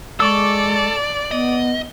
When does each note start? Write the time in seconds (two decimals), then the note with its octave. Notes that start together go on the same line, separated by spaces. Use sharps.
0.20 G#3 A4 D5 C#6 D6 E6
1.31 B3 D#5